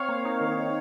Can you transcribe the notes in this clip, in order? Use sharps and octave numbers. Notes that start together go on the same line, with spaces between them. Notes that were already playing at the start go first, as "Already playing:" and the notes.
Already playing: C4 C#5 F5
A#3
D#4
D#3
D#3